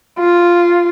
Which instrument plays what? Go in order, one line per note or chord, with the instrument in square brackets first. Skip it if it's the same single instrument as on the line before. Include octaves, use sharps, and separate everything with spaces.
[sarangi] F4